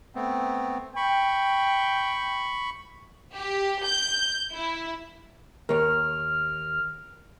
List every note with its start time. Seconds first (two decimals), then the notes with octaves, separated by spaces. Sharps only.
0.15 A3 B3 C4
0.96 G5 B5 C#6
3.36 G4
3.84 G6
4.55 E4
5.69 D#2 A#4 C#5 F6